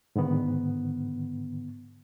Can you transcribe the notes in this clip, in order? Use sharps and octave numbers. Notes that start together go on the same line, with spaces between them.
G#2 D3 D#3 B3